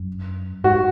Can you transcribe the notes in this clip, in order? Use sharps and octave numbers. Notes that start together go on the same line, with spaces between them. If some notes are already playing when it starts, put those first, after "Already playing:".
Already playing: F#2
G#2 F#4